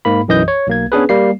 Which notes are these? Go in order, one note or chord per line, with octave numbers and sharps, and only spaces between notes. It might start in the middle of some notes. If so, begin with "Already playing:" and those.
G#2 A#3 B5
B1 F#2 E3 D#5 D#6 G6
C#5
B1 A#3 G#6
B3 C#4 D4 G#4 B4
G3 A#3 C7